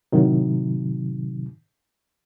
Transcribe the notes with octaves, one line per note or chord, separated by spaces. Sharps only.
A2 C3 D#3 F#3